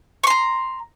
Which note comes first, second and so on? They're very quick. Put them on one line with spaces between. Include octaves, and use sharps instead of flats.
C#6 C6 A#5